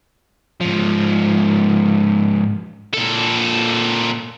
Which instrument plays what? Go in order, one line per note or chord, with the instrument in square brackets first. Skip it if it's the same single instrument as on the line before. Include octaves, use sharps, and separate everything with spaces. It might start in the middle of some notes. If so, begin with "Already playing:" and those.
[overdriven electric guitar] G#2 F3
[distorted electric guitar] A#2 A4